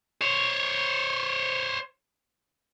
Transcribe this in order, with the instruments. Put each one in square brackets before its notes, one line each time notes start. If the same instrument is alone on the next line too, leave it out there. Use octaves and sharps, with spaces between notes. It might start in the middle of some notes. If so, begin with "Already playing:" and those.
[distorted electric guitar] C5 C#5